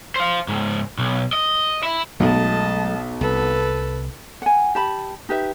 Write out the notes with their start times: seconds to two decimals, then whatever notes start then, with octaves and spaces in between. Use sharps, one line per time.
0.16 C5 F5
0.48 C#2 G#2
0.98 B1
1.33 D#5
1.83 E4
2.20 B1 F#3 G#3 A3 D#5 A5
3.21 C2 A4 B4
4.42 F#5 G#5
4.75 G4 A5 B5
5.29 D#4 G4 B4 E5